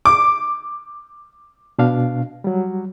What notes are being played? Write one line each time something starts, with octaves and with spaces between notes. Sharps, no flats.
D6
B2 D4 F5
F#3 G3